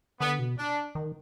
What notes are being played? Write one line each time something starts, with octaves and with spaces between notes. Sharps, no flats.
D3 B3
B2
D4
D#3